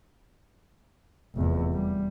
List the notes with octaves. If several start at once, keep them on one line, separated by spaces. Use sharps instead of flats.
F1 E2
G3